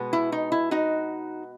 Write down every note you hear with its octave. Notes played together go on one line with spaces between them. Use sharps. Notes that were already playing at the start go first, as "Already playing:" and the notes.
Already playing: B2 G#3 B3
E4
D#4
E4
D#4 F#4